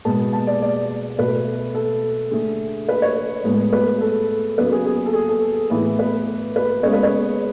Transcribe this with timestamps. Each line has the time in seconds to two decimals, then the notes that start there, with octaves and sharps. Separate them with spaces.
0.05 B2 G#3 B3 A5
0.33 A5
0.47 D5
0.62 D5
1.18 B2 A3 B4
1.75 A4
2.31 D3 A3 G#4
2.89 B4
3.02 C#5
3.44 A2 G#3 B3
3.73 B4
4.01 A4
4.58 C#3 F#3 B3 B4
4.72 G#4
4.86 G#4
5.06 A4
5.14 G#4
5.29 A4
5.70 A2 E3 B3
5.99 B4
6.56 B4
6.83 C#3 G#3 B3 C#5
6.93 B4
7.03 C#5